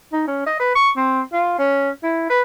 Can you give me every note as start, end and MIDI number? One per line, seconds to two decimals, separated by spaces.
0.13 0.25 63
0.28 0.46 61
0.47 0.60 75
0.60 0.74 71
0.76 0.90 85
0.97 1.21 60
1.33 1.56 65
1.59 1.90 61
2.03 2.28 64
2.30 2.42 71